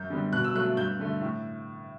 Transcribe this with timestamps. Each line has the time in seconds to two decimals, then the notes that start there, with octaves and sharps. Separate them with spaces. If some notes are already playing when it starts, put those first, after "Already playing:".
Already playing: F#2 G6
0.10 D3 G3 B3
0.32 B2 F#6
0.44 E6
0.54 F#3 A3 F#6
0.77 G2 G6
0.99 D3 A3
1.22 A2